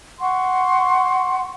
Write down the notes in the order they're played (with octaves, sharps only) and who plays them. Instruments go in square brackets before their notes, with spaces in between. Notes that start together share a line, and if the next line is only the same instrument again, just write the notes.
[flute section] F#5 C6 C#6